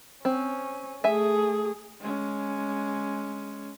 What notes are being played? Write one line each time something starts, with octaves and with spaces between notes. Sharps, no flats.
C4 C#4
A3 G#4 E5 G#5
G#3 C#4